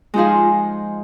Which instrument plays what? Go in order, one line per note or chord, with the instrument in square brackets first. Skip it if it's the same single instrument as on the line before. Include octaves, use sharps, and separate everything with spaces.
[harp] F3 G#3 D#4 G#4 [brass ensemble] F4